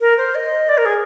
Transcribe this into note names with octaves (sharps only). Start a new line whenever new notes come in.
A#4
C5
D#5
D5
A#4
G#4